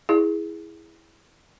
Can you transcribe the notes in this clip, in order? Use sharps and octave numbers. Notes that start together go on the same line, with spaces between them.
E4 G#4